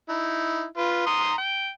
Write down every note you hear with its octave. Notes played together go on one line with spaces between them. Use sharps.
D#4 E4
F4 B4
A#5 C6 D#6
G5